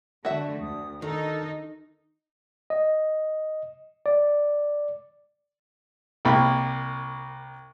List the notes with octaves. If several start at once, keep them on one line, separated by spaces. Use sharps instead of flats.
D3 A3 F#4 E5
D2 D#6
D#3 D#4 A4
D#5
D5
C2 A#3 G5 B5